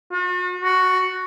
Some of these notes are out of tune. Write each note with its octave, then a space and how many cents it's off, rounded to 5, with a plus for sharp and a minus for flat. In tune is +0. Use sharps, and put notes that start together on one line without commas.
F#4 -45
F#4 +5